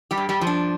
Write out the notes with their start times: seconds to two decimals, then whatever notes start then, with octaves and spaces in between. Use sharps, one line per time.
0.11 G3 G4
0.18 G2
0.29 G3 G4
0.41 F3
0.47 D4